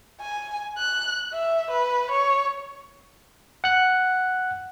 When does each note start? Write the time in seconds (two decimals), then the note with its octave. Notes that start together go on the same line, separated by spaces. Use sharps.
0.21 G#5
0.78 F#6
1.33 E5
1.71 B4
2.11 C#5
3.64 F#5 F#6